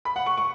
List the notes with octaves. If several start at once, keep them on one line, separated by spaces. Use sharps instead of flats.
B5
F#5
C#6
C#6